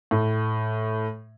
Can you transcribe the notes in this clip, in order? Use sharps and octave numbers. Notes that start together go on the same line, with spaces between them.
A2